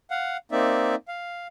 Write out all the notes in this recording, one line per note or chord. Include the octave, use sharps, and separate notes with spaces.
F5 F#5
A#3 C4 D#4 D5 E5
F5